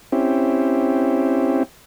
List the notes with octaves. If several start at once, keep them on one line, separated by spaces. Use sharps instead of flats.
C4 C#4 E4 G4